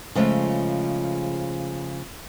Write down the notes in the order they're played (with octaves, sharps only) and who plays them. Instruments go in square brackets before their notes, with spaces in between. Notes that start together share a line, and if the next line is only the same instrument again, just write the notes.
[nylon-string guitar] C#3 F3 G#3 A3